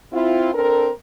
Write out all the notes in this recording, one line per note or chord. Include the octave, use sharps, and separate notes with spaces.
C4 E4 F4
C4 D4 A4 A#4